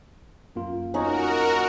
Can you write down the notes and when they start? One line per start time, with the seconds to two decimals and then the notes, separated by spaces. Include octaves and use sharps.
0.56 F#2 A#3 F4
0.94 C#4 D#4 F#4 A#4